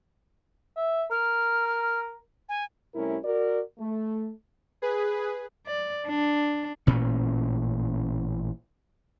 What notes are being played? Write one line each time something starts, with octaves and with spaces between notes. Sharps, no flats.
E5
A#4 F6
G#5
C3 G3 A3 C#4 E4 A#4
F#4 A#4 D5
A3
G#4 B4
D5
D4
A1 A#2 C#4